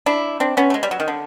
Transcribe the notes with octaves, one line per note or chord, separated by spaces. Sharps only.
D4 E4
C4 D4
B3 C#4
A3
G#3
G3
F#3
D#3
D3